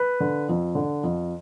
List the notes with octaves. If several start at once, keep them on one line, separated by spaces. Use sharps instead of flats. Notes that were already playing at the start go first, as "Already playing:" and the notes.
Already playing: B4
D3
F2
D3
F2